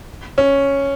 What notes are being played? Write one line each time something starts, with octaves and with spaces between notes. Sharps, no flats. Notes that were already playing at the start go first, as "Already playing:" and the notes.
C#4